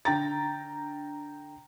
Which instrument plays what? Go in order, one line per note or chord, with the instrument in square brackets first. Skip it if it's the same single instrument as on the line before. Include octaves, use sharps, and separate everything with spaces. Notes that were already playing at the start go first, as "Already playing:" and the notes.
[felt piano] D3 G5 A#5 A6